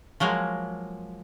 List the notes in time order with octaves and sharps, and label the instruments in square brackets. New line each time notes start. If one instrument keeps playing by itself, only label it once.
[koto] F3 F#3 G#3 A#3